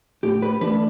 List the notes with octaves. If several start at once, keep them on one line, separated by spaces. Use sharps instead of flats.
A2 G4
B4
E3 A3 D4 B4